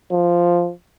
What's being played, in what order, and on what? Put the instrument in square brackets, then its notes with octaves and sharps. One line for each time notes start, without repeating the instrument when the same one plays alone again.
[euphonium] F3